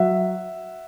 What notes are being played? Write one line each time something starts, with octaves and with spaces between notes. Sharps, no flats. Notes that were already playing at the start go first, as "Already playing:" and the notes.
Already playing: F#3 E5 F#5